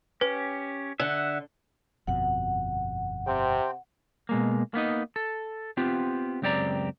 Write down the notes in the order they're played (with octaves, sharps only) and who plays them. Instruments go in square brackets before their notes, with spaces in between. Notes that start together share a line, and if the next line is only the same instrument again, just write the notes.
[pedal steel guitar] C#4 G4 [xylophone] B4
[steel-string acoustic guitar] D3 [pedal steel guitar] E5 F#5
[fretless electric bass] G1 F2 B2 [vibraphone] F#5
[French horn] C3 [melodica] C4 G5
[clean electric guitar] B2 G#3 A#3
A#3 B3 D#4 D#5
A4
B3 C4 F4 G4
C#2 F#2 C4 G4 D5 A#5